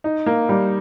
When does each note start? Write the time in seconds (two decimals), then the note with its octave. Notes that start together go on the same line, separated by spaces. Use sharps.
0.04 D#4
0.26 A#3
0.49 G3